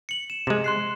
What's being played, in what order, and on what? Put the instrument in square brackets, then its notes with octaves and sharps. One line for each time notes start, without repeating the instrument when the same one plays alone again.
[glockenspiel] C#7 F#7
E7
[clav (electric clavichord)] C3 G#3
[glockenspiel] C6 F#6 C7